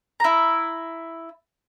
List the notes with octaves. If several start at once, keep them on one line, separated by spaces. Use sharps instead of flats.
E4 A#5